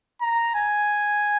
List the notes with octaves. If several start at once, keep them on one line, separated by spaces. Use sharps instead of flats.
A#5
G#5